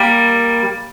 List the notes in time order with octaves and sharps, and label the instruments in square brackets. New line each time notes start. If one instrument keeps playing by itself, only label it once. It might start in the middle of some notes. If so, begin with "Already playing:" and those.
Already playing: [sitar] G3 A#3